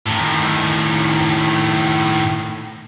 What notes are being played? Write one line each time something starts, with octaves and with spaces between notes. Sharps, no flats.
A2 D#3